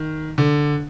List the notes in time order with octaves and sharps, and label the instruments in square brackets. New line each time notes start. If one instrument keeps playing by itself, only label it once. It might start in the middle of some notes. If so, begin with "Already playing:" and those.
Already playing: [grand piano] D#3
D3